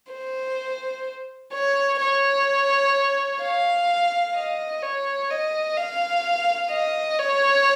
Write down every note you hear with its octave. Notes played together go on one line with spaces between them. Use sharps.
C5
C#5
C#5
F5
D#5
C#5
D#5
F5
D#5
C#5